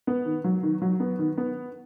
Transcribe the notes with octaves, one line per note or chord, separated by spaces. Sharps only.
B3
D#3
F#3
D#3
F#3
B3
D#3
B3